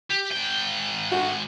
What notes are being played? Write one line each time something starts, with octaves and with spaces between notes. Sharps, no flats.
G4
G#2 G5
F#4